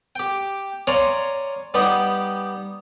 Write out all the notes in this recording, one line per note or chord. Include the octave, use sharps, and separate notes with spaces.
G4 G5
C#5 D5 F5 G#5 A#5 C6
G3 B3 D#4 G4